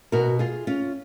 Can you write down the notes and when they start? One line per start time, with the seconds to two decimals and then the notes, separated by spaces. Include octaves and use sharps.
0.12 B2 F#4 A#4
0.39 F4 G#4
0.67 C#4 F4